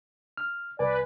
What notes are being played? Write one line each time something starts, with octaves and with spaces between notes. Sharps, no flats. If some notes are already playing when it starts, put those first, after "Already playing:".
F6
C2 B4 D5 G#5